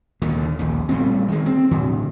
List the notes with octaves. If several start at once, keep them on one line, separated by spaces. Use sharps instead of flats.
D#2 A#2 D3
A#1 D#2
A#2 G3 A3 C4
D#3 G#3
C4
A2 D3